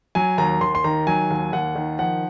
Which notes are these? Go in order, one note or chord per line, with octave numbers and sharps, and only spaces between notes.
F#3 G#5
D#2 A#5
D#2 C6
C6
D#3 A#5
F#3 G#5
D#2
D#2 F#5
D#3
F3 F#5